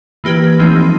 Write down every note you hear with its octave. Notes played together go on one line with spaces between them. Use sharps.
E3 A#3 G4 B4 G#6
E3 F3 G#3 A3 C4 D#4